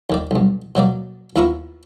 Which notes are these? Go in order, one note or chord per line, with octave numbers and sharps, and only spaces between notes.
D#2 D#3 D5
B1 G2
B2 F#3 A#3 D5
D#2 B3 E4 F4 A#4 C#6